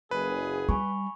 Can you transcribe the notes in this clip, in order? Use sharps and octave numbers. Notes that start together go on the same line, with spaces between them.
F#1 G#4 B4
G3 G#5 B5 C#6